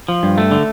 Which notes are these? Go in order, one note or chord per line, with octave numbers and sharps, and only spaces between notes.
F3
G2
A3
D3